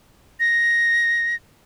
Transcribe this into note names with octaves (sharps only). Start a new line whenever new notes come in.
A#6